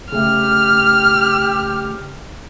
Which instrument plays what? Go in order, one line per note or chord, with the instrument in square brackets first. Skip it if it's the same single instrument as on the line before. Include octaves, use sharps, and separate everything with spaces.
[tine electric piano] C#3 A3 [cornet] G4 [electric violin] F6